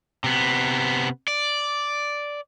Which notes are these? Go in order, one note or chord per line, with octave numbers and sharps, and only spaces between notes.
C3 B3
D5